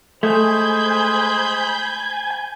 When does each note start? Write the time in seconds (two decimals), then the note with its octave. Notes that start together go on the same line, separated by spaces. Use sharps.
0.23 G#3 A3 C5 G#5 B5 G6